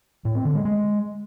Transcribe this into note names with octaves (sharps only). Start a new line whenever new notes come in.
A2
C4
D3
G#3
G#3